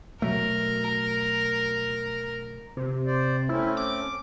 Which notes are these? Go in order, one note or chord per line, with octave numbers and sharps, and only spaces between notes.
B2 F#3 A3 A#4
C3
C5 D5
A3 C4 C#4 E4
D6